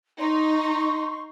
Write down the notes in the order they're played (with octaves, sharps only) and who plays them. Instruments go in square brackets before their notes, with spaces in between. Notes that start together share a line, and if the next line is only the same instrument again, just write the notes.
[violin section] D#4 [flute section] C6 C#6